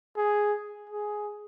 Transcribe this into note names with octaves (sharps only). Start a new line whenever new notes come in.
G#4
G#4